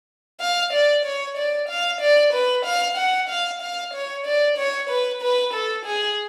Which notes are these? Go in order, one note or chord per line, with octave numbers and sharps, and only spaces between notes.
F5
D5
C#5
D5
F5
D5
B4
F5
F#5
F5
F5
C#5
D5
C#5
B4
B4
A4
G#4